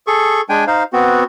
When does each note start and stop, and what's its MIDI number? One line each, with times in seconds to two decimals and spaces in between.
0.07 0.41 68
0.07 0.41 69
0.07 0.41 85
0.49 0.65 56
0.49 0.65 62
0.49 0.65 79
0.49 0.65 80
0.67 0.83 63
0.67 0.83 72
0.67 0.83 77
0.93 1.24 59
0.93 1.24 60
0.93 1.24 66